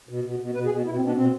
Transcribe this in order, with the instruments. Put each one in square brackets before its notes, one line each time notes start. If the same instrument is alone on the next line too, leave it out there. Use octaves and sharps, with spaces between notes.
[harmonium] B2
B2
B2
B2 B4
G#4
B2
B2 E4
C4
B2
D4
B2 C4